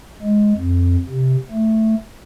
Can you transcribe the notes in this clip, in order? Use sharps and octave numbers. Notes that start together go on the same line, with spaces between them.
G#3
F2
C3
A3